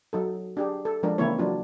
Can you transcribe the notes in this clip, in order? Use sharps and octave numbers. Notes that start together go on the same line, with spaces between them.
F#3 D#4 A4
D4 G4 G#4
A4
F3 G#3 D4 A#4
C#3 E3 A#3 C4 E4 C#5
F#3 D4 F4